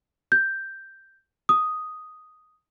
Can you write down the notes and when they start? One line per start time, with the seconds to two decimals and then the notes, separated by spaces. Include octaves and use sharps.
0.32 G6
1.49 D#6